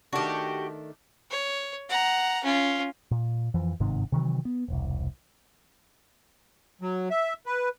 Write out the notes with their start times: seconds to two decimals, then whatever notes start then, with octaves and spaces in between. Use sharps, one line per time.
0.13 D#3 A3 D4 F#4 G4
1.31 C#5
1.89 F#5 A#5
2.44 C#4 F4
3.11 A#2
3.54 F2 E3 F3
3.80 G1 G#2 C3 D#3
4.12 C3 D#3 E3 F#3
4.45 B3
4.68 E1 C2
6.82 F#3
7.10 E5
7.46 B4